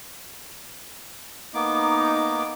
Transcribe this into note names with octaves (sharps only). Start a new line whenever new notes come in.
A#3 B3 D#4 D6